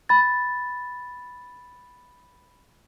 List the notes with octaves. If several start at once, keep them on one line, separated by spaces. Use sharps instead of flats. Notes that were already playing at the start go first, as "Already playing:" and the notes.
B5 A6